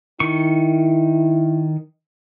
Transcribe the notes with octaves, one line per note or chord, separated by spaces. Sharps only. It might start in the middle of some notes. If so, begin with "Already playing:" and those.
D#3 E4 C#6